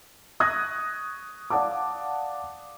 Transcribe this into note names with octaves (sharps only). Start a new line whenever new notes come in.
C#6 D#6 F#6 G#6 A#6
D5 F5 F#5 A5 D6